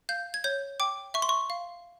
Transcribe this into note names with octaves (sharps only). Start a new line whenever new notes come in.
F5 G6
G#6
C#5 G6
G5 D6
E5 C#6
C6
C#6
F5